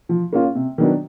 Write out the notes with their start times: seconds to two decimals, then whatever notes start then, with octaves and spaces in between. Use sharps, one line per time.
0.09 F3
0.33 A#3 C#4 F4
0.55 C3
0.78 D#3 F#3 B3 D4